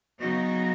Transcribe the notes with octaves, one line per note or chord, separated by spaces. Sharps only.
C#3 F#3 B3 D#4 F#4